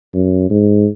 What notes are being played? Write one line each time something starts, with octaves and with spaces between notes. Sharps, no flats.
F#2
G#2